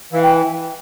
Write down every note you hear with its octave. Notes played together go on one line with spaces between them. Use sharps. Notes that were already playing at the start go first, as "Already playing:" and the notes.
E3 F5
G5